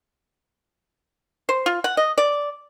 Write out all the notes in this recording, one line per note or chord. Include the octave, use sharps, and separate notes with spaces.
C5
F4
F#5
D#5
D5